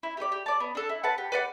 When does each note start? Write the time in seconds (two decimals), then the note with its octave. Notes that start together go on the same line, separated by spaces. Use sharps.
0.03 E4
0.17 G4 B4 D5
0.32 G4
0.46 D5 A5
0.60 B3
0.75 D4 A4
0.89 E4
1.03 B4 F#5 A5
1.18 G4
1.32 B4 D5 F#5